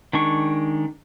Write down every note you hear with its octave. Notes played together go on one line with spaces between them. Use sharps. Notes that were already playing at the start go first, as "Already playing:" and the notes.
D#3 G#3 D4 C#6